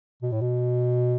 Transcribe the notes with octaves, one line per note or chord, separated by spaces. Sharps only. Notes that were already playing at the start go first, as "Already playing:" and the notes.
B2
A2
B2